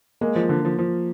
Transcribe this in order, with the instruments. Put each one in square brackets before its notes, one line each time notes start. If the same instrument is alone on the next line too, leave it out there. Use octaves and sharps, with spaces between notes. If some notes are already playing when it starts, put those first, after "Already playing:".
[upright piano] G#3 [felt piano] A#3
[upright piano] F3
D3
F3
F3